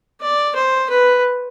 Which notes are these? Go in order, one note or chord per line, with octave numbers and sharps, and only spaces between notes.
D5
C5
B4